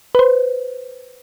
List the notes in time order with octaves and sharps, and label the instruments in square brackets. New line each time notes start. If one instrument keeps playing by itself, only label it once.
[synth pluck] B4 C5